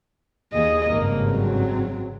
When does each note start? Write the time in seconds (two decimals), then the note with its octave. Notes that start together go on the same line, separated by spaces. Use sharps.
0.53 D#2 G#4 D#5
0.90 G#1 G2 C#3 A#3
1.30 F#3 C4